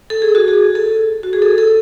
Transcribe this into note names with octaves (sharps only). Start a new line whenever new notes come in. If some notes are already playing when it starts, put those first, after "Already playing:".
A4
G#4
F#4
G#4
A4
F#4
G#4
A4
A4